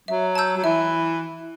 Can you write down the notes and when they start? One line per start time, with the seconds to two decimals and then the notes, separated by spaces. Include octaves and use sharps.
0.08 F#3 E5
0.35 A5 E6 G6
0.57 F#3
0.64 E3 E5